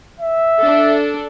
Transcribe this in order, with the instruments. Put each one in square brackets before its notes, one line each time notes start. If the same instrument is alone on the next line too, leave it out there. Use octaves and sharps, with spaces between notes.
[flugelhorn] E5
[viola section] D4 A4